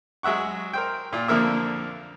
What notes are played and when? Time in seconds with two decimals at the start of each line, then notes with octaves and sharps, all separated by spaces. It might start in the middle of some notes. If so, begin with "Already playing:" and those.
0.23 F#3 G#3 E5 F#5 C#6
0.73 A#4 C5 G5
1.13 A#2 F4
1.28 F2 D3 F3 A#3 A#4 E5